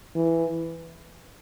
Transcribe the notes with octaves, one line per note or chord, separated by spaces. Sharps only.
E3